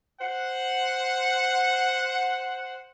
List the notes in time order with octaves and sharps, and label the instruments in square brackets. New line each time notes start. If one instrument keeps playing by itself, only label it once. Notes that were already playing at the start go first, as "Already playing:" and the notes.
[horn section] C5 F#5